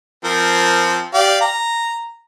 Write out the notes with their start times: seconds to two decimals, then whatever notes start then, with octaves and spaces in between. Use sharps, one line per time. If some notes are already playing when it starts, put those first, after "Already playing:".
0.25 F3 C4 A#4
1.14 G4 D5 F5
1.41 A#5